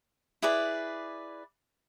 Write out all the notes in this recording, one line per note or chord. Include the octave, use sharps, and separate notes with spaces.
E4 G#4 B4 D5